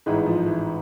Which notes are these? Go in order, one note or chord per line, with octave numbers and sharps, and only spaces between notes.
A1 G#2 E3 G#3
F3
E3